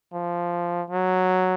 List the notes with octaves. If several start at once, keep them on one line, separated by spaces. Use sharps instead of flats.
F3
F#3